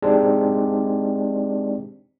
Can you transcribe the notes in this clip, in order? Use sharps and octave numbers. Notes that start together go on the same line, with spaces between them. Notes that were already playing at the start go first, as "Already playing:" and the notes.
G#3 C4 D4 D#4 G4 D5